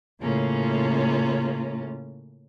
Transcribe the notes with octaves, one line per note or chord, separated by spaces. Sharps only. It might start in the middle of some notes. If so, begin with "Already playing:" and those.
A2 C#3 A#3 C#4 F4